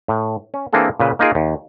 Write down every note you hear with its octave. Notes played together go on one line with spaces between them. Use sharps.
A2
C#4
E3 A#3 C4 D4 G#4 A4
A#2 C#3 B4
A#3 D#4 F4 G#4 A#4
D#2